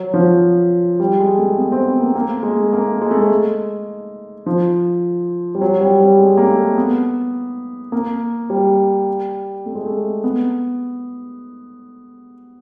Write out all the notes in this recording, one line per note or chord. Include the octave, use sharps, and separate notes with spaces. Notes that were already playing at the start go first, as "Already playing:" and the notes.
Already playing: F#3
F3
G3
G#3
A3
B3
C4
B3
A#3
A#3
A3
G#3
A3
A#3
G#3
A3
G#3
F3
G3
F#3
G3
G3
G#3
A#3
A3
B3
A#3
G3
A3
G#3
A3
B3